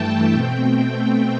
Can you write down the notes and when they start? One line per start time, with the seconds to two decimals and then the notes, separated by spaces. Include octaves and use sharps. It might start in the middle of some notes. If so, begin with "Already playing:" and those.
Already playing: G2 E3 A3 G5 A5
0.32 B2 A3 C4 G5